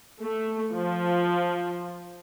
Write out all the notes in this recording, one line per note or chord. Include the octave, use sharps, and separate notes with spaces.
A3
F3